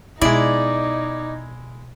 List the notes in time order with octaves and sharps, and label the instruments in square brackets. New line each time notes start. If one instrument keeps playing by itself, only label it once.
[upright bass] B2 [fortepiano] G#3 E4 [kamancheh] D#4 [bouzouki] D5